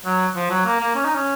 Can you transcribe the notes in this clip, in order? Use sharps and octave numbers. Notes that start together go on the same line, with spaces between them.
F#3
F3
F#3
A#3
A#3
C#4
D#4
C#4